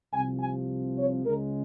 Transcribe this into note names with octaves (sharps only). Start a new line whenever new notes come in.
C2 C3 F3 G#5
G#5
C#5
C#2 C#3 G#3 A#4